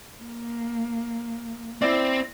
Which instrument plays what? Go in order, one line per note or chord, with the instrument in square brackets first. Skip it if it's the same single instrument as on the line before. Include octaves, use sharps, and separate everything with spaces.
[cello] A#3
[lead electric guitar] C4 [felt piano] E4 D5